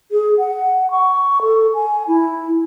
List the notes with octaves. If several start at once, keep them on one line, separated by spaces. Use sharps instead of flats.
G#4
F#5
C#6
A4
G#5
E4